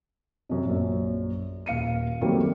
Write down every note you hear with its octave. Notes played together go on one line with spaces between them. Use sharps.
F#2 C3
A#1 F#2
D#1 F5 C#7 D#7
D#3 F#3 G3 A3 A#3 C4